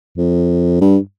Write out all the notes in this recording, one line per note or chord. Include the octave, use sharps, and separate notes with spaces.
F2
G2